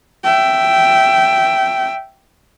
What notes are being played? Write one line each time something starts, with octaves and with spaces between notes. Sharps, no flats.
E5 G5